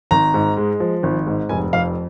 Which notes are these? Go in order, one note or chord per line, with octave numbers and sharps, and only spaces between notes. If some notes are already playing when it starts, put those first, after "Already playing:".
G#1 A#5
G#2
G#3
F3
G#1
G#2
F1 G#5
F2 F5